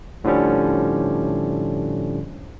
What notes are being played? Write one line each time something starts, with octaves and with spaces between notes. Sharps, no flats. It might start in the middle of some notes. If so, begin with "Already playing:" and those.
A2 D3 F3 G3 C#4